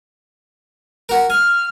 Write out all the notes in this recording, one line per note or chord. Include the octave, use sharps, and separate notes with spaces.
F#4 A#4
G#5 F6